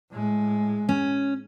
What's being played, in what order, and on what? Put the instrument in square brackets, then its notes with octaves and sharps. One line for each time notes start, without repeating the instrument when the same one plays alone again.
[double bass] A2 G#3
[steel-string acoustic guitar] C#4